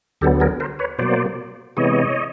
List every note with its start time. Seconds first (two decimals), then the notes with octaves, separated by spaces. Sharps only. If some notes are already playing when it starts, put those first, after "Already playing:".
0.21 D2 D3 F#3 B3 G4 A4
0.40 G#4 A#4
0.60 A#4 C5
0.79 B4 C#5
0.99 B2 F#3 A#3 C5 D5
1.77 C3 E3 G#3 B3 C#5 D#5